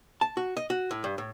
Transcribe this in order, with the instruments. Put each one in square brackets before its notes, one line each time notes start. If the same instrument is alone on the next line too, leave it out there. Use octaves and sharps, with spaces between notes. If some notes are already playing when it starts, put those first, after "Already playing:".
[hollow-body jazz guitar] A5
F#4
D#5
F#4
A2
G2
A2